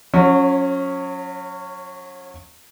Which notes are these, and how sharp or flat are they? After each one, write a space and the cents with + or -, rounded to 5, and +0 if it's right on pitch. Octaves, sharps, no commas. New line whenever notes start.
F#3 -35 C#4 +0